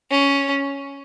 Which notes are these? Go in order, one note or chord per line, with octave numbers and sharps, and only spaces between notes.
C#4